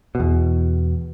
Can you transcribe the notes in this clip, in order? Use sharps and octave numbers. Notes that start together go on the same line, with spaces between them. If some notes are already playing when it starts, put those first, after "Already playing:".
E2 B2